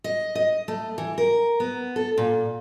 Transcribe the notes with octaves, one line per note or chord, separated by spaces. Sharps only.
D#5
D#5
A3
E3
A#4
B3
A4
A#2